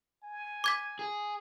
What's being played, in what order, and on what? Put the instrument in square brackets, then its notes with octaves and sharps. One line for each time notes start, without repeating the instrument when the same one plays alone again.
[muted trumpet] G#5
[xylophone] D6 G#6 B6
[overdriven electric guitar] G#4